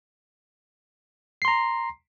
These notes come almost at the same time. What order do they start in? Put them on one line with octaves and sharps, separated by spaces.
C7 C6 A#5